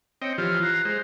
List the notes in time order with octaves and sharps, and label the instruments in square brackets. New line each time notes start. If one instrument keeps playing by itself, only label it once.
[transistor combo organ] C4 D#5 G5 [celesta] C#5 C#7
[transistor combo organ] E3 F3 F4 [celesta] G4
[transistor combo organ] A#5 [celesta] F#6 C7
[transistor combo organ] G#3 C5